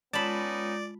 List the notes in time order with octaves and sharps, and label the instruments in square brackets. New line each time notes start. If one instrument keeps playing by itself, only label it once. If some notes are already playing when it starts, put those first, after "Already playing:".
[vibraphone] G#3 F4 [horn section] B3 C#4 D#4 [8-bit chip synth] D5 [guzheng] A5 B5